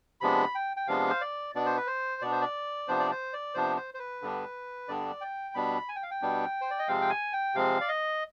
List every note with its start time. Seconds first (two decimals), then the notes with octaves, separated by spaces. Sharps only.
0.21 C3 F3 G#3 B3 D4 B5
0.55 G5
0.77 G5
0.87 C3 F3 G#3 B3 D4 F5
1.10 C5
1.21 D5
1.55 B2 B3 D4 D5
1.66 C5
1.77 B4
1.87 C5
2.22 B2 B3 D4 D5
2.32 C5
2.41 D5
2.88 C3 F3 B3 D4 C5
2.99 D5
3.11 C5
3.33 D5
3.54 C3 F3 B3 D4 C5
3.77 C5
3.94 C5
3.99 B4
4.22 G2 D3 G3 B3 D4
4.88 G2 D3 G3 B3 D4 D5
5.21 G5
5.55 B2 G3 B3 D4 B5
5.89 G#5
5.96 G5
6.03 F5
6.11 G5
6.22 B2 G3 B3 D4
6.61 C5
6.70 D5
6.79 D#5
6.88 C3 F3 G#3 C4 F5
7.02 G5
7.10 G#5
7.33 G5
7.55 C3 F3 G#3 C4 F5
7.81 D5
7.88 D#5